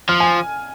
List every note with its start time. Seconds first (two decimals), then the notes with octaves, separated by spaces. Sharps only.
0.09 F3 F6
0.20 G#5